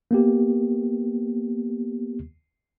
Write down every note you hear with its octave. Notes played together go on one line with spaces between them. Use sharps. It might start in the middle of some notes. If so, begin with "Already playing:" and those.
A#3 B3 G4